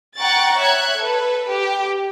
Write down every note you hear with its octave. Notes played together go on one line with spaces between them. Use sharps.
F#5 G5 A#5 C#6 F#6 A6
C#5 E5 F#6 G#6
A4 B4
G4